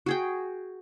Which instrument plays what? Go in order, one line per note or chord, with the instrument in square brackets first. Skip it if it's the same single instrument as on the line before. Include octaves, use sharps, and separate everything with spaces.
[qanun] F#4 G#4 G5